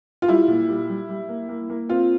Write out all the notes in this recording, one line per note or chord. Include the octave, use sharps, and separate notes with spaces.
F4
G3 E4
A#2
G3
G3
G3
A#3
A#3
A#3
C4 F4